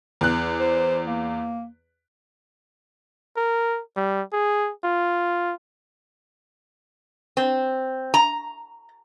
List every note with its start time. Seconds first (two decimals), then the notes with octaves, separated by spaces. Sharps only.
0.21 E2 F#6
0.60 C5
1.07 A#3
3.37 A#4
3.96 G3
4.32 G#4
4.84 F4
7.37 C4
8.14 A#5